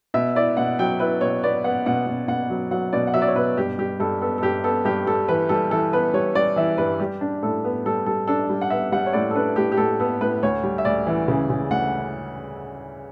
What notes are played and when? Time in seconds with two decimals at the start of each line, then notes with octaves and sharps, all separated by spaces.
0.14 B2 E5
0.35 E4 D5
0.57 B2 F#5
0.79 F#3 G5
1.00 E4 B4
1.21 B2 C#5
1.44 B3 D5
1.64 B3 F#5
1.86 B2 F#5
2.07 B2
2.28 B2 F#5
2.50 F#3
2.71 F#3 F#5
2.93 B2 D5
3.07 F#5
3.14 F#3 E5
3.22 D5
3.28 C#5
3.36 B2 B4
3.57 G2 G4
3.79 G3 G4
4.00 G2 A4
4.22 B3 A4
4.38 A4
4.42 G2 G4
4.64 B3 A4
4.85 G2 G4
5.06 G3 A4
5.28 E3 B4
5.49 G3 A4
5.71 E3 A4
5.93 B3 B4
6.14 G3 C#5
6.35 G3 D5
6.56 E3 E5
6.78 G2 B4
7.00 G3 G4
7.21 D4
7.43 A2 A4
7.64 B3
7.86 G3 A4
8.06 G3 A4
8.28 D4 A4
8.49 G3
8.61 F#5
8.70 B3 E5
8.92 G3 F#5
9.06 C#5
9.13 A2 D5
9.31 A4
9.35 D4 B4
9.56 A2 G4
9.72 G4
9.77 A2 A4
10.00 B3 A4
10.21 A2 B4
10.43 D2 C#5
10.63 G3
10.78 E5
10.85 D2 D5
11.07 E3
11.28 C#3
11.50 C#3
11.70 D2 F#5